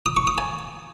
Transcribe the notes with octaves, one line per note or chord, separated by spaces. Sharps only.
D#6
C#6
D#6
G#5